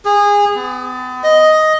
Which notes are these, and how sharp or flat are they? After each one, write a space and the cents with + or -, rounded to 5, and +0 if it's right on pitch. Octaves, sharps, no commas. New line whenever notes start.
G#4 -25
B3 +40
D#5 +5